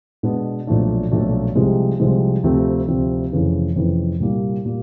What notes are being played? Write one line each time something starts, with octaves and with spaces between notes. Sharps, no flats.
B2 G#3 B3 D4
B1 A#2 F3 A3 D4
B1 A#2 F3 A3 D4
C2 C3 F3 G#3
C2 C3 F3 G#3
D2 C3 F3 A3 C4
D2 C3 F3 A3 C4
F1 F2 C#3 E3
F1 F2 C#3 E3
C2 A#2 G3 A#3
A#2 G3 A#3